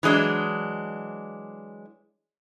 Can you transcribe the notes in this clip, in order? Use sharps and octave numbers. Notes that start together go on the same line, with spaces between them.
E3 F#3 G#3 D4